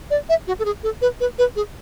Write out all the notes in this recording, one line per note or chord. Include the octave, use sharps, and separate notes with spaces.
D5
E5
F#4
A4
G#4
A4
B4
B4
B4
G#4